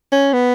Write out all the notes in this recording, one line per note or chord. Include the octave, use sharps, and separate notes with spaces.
C#4
B3